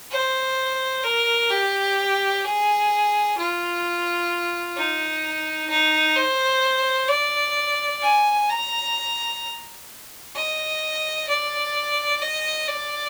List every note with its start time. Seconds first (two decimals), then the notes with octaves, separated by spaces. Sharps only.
0.11 C5
1.04 A#4
1.50 G4
2.44 G#4
3.38 F4
4.77 D#4
5.70 D#4
6.16 C5
7.09 D5
8.02 G#5
8.49 A#5
10.35 D#5
11.28 D5
12.22 D#5
12.68 D5